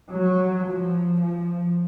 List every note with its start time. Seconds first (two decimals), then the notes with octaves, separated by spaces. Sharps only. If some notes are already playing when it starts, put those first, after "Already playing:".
0.11 F#3
0.66 F3
1.22 F3